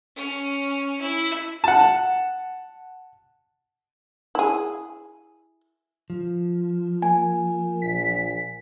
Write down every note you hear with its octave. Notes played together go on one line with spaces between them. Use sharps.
C#4
E4
F#5 A5
E4 G#4
F3
A#3 G#5
A#1 B6